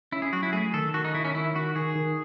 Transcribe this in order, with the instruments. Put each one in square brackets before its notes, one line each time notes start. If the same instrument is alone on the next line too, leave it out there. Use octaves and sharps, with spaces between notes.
[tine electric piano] C#4 [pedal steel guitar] E4
[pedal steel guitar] G#4
[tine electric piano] F#3 [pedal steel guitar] F#4
[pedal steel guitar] E4
[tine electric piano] A3 [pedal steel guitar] G#4
[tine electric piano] D#3 [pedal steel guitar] A4
[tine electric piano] D#3 [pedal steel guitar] F#4
[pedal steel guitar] D#4
[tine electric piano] D#3 [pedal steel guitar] E4
[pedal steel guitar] C#4
[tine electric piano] D#3 [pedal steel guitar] E4
[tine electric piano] D#3 [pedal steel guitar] F#4
[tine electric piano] D#3 [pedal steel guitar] G#4
[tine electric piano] D#3